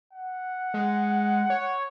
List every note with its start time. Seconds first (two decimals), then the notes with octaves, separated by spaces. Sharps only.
0.13 F#5
0.74 G#3
1.50 C#5